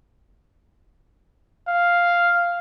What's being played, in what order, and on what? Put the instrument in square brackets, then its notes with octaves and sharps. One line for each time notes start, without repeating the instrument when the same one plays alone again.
[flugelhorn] F5